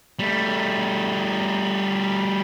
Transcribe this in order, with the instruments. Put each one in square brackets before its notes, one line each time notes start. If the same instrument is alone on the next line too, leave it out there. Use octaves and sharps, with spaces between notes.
[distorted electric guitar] G3 A3